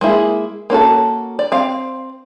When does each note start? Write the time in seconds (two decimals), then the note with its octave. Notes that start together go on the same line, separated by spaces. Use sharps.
0.01 G#3 A#3 E4 G#4
0.70 A#3 C#4 F#4 A4
1.39 D5
1.52 C4 F5